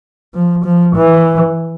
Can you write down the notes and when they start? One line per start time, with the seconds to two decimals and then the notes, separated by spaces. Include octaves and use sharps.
0.34 F3
0.65 F3
0.96 E3